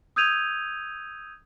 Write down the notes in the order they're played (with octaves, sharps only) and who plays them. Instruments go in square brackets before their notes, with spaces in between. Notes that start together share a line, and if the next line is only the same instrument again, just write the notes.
[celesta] D#6 E6 G6 G#6 D#7 F7